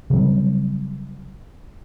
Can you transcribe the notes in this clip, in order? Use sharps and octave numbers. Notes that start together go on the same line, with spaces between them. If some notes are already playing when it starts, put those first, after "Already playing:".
C#3 F#3 G3 C4